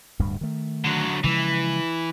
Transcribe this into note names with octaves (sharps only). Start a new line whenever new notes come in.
D1 D2 G2
D#3 A3
D3 F#3
C#3 E3 F3 G#3